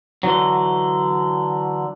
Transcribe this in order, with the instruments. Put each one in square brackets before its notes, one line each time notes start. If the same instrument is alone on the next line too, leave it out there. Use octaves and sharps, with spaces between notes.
[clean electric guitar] D3 E3 F#3